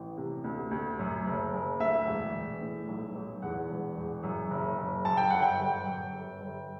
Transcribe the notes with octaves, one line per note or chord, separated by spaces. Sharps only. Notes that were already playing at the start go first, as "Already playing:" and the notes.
Already playing: A1
C3
D2
D2
F#2
F#1
F#1
D2 E5
E1
E1
A2
B1
B1
E2 F#5
E1
E1
F#2
F#1
F#1
F#2 A5
G5
G1 F#5
G5
G1
F#2
G1
G1